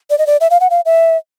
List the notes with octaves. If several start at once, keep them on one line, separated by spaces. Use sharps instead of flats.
D5
D#5
D5
E5
F5
F#5
F5
E5